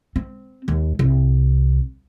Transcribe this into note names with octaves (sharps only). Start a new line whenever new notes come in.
C4
D#2
C2